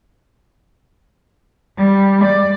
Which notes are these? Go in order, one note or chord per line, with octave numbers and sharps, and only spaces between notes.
G3
D5